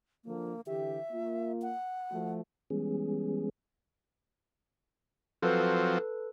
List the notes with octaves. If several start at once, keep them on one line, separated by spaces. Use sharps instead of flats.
D3 F3 A#3
D3 E3 G4 E5
A#3 F4
F#5
F3 A3 F#4
E3 G3 G#3 B3 C#4 G#4
F3 F#3 C4 A4 B4